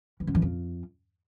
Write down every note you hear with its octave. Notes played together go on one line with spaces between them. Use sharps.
E3
F#2
E3
F2